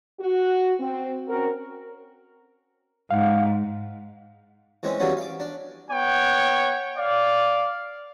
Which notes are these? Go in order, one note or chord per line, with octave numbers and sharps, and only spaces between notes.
F#4
C4
C4 C#4 F#4 A#4
G#2 F5 F#5
E3 G#3 C4 C#4
C#3 E3 F#3 G3 B3 C#4
F5 D6
D4
B3 C#5 F#5 G5
D5 F5